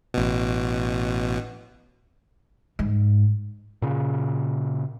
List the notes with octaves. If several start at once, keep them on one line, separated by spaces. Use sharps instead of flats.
A1 B2
G#2
A#2 C#3